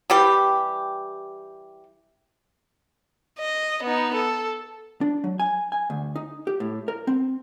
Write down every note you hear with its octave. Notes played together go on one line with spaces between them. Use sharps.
E3 G3 G4 G5
D#5
B3 D#4
A4
D4
F#3
G#5
G#5
D2
D#4
G4
A2
A#4
C4